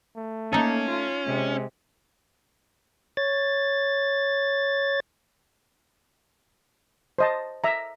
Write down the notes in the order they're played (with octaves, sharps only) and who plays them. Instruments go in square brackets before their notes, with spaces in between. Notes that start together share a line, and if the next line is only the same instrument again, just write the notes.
[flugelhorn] A3
[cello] A#3 [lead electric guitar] C#4 [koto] D#4 A4
[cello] F4
[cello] C3 [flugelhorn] G#3
[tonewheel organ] C#5 A6
[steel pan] C5 D#5 A5
E5 A#5